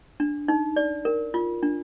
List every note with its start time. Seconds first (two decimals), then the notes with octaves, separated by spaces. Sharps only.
0.20 D4
0.48 D#4
0.76 D5
1.05 A#4
1.34 F4
1.63 D4